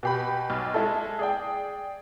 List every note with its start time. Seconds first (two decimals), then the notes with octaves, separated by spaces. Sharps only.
0.03 B2 G4 B5
0.50 B1
0.74 G#3 E4 A4
1.19 G#4 D5 G5